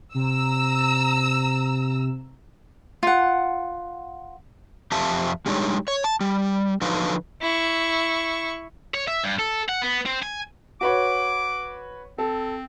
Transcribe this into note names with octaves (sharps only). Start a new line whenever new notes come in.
C3 A#5 E6
F4 F#5
F2 C4 G4 E5 F5 A5
G3 G#3 D4 D#4 G4 C#5
C#5
A5
G3
D3 F3 F#3 D#4 B4 F5
E4 C#6
C#5
E5
G2
A4
F#5
B3
C4
G#5
F#4 B4 C#5 D6
C4 A4